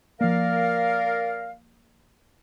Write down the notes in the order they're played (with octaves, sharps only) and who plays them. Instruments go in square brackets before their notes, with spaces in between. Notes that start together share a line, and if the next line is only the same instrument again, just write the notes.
[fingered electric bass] F3 A#3 [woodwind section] A#4 D5 F5